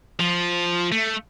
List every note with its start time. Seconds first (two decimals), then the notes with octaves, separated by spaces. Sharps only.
0.20 F3
0.92 A3